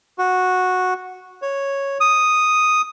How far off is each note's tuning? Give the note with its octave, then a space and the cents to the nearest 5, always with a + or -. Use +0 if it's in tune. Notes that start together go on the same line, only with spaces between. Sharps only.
F#4 -10
C#5 -5
D#6 +0